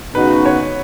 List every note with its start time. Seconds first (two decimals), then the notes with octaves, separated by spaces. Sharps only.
0.14 C#3 B3 D#4 F#4 B4
0.46 C#5